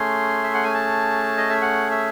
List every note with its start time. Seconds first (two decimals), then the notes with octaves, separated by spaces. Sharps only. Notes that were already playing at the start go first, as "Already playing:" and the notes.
Already playing: A3 C#4 G#4 C6
0.43 E5
0.54 F#5
0.64 G#5
0.74 A5
1.37 D#5
1.50 E5
1.62 F#5
1.91 E5